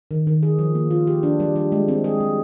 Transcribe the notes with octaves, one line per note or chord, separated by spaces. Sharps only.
D#3
D#3
G#4
F3
A#3
F4
G4
D4
G3
G3
G#3
C4
G#4
G3